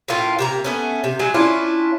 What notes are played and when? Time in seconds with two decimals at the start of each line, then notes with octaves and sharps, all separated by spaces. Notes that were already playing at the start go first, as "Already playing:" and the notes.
0.08 A2 C#4 F4 A#4
0.39 C3 A#3 A#5
0.64 A3 B3 C#4
1.04 C3
1.19 F#3 G#3 G#4
1.34 C#4 D4 E4 F4